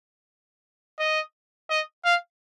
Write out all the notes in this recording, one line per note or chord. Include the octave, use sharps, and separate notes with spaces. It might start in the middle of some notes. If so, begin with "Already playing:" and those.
D#5
D#5
F5